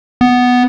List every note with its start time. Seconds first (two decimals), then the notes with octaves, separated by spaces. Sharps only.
0.21 B3